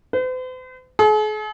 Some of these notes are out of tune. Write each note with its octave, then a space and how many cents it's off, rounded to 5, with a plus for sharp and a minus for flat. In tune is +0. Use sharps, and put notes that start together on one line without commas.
C5 -45
G#4 +45